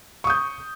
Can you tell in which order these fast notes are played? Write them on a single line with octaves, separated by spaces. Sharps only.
C#6 D#6 G6